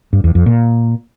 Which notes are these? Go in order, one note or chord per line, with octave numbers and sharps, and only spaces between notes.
G2
E2
F2
A#2